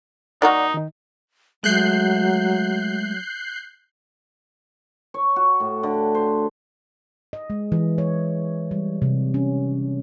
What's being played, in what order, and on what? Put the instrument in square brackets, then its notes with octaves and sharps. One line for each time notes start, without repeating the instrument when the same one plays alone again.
[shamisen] D#3 A#3 F#4 [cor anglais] D#4 [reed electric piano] D5 F#5
[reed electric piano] D#3 D#4
[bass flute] F#3 [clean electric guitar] G#3 A3 [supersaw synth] F#6 G6 C7
[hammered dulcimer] C#5
F#4
A2
D3
C5
[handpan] D#5
G#3
E3
C#5
G3
C3
C#4